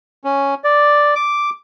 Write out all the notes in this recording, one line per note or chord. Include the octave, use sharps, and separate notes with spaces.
C#4
D5
D6